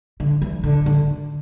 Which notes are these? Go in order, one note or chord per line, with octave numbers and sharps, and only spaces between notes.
D3
E3
D3
D3